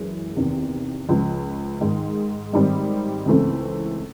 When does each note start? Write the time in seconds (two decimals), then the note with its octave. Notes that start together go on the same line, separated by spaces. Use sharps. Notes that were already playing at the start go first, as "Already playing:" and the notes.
Already playing: F#2 E3 G#3
0.36 E2 C3 D#3
1.09 C#2 C#3 F3
1.81 G#2 D#3 G#3
2.53 G#2 D#3 G3 C4
3.26 C#2 C#3 E3 A3 C4